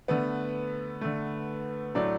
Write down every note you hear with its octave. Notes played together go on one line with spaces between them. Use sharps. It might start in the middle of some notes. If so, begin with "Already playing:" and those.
D3 A3 B3 B4
D3 A3
A2 F#3 A3 D4 D5